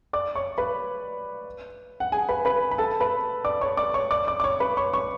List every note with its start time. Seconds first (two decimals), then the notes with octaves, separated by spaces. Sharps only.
0.13 D5 D6
0.35 C#5 C#6
0.58 B4 B5
2.00 F#5
2.12 G#4 G#5
2.29 B4 B5
2.45 B4 B5
2.71 B5
2.78 A4 A5
3.00 B4 B5
3.44 D5 D6
3.61 C#5 C#6
3.77 D5 D6
3.94 C#5 C#6
4.11 D5 D6
4.27 D5 D6
4.40 D6
4.44 C#5 C#6
4.60 B4 B5
4.77 C#5 C#6
4.93 C#5 C#6